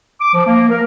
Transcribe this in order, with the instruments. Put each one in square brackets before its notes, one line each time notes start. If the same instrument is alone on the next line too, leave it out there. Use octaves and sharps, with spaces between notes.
[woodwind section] D6
F3
A#3
A#4